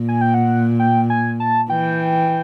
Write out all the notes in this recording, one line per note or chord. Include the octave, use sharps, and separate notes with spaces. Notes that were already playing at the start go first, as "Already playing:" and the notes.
Already playing: A#2
G#5
G5
F#5
G5
G#5
A5
E3 G5